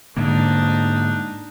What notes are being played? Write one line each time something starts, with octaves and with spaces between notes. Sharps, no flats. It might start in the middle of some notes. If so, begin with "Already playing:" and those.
G#2 D3 A#3 D4 D#4